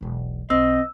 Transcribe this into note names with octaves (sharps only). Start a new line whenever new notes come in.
E1 B1
B1 C4 D#5 E6